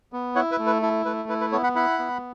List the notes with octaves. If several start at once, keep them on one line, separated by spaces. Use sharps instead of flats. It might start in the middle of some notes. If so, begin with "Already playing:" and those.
B3
E4 C#5 F#5
B4 E5
A3
B4
E4 A4
A3 B4
E4 B4
B4
B3 A4 C#5
F#5 B5
E4 F#5 B5
B3